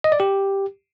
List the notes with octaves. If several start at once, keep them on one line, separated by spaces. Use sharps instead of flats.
D#5
D5
G4